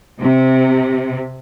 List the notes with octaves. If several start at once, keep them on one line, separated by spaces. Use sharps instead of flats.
C3